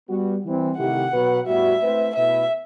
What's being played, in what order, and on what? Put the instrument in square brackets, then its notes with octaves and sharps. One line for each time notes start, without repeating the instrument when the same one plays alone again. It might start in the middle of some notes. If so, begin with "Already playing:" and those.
[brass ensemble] G3 B3 F#4
E3 G3 C4
[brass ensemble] C3 D#3 A3 E4 G4 [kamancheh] F#5
[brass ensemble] B2 F#3 B3 F#4 B4
[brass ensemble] A2 G3 B3 F#4 [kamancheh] E5
[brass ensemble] A3 C4 E4 B4
[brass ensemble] B2 A3 E4 B4 [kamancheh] E5